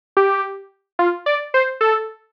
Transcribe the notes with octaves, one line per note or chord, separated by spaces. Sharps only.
G4
F4
D5
C5
A4